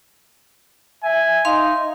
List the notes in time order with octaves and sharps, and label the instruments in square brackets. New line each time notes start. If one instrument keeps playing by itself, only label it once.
[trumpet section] E5 G#5
[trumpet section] D#4 [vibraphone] F5 C6